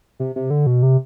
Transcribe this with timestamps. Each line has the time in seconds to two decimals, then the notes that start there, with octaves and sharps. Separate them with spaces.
0.20 C3
0.36 C3
0.50 D3
0.66 B2
0.83 C3